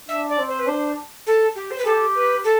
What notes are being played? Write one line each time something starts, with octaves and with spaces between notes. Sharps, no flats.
D4 E5
D5
C4
C5
B4
D4 C5
A4
G4
C5
B4
G4 A4
B4
A4